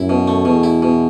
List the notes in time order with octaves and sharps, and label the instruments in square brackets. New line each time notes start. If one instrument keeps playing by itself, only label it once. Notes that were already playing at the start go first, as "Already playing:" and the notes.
Already playing: [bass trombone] F#2 [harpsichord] E4
[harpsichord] B2
A3
[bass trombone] E2 [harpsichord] B2
[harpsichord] E4
B2